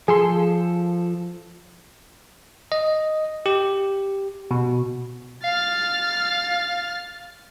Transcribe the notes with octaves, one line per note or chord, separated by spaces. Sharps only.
F3 G#4 A4 C6
D#5
G4
B2
F5 F6 A6